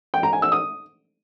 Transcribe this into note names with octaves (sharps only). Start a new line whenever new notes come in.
G5
A#5
G#5
E6
D#6